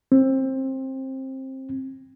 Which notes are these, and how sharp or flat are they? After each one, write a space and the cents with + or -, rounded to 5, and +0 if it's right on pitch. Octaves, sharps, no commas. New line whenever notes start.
C4 +20